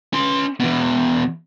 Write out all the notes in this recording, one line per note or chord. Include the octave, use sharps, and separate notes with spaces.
C#4 C6
E2 B2